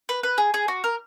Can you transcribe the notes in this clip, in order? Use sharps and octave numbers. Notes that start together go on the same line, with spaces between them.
B4
B4
G#4
G#4
F#4
A#4